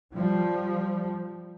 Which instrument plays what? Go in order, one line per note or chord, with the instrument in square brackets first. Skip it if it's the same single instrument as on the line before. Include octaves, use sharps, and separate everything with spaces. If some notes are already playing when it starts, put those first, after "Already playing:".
[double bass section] F3 G3